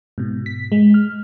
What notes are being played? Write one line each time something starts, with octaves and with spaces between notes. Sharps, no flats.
G#2 B2
B6
G#3
F6